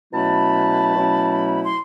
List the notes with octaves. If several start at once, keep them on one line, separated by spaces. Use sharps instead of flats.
B2 F#3 A3 C#4 E4 A5 B5
B2 F#3 A3 C#4 E4
C6